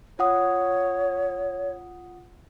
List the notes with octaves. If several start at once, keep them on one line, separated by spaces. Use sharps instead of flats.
F4 C#5 F#5 D#6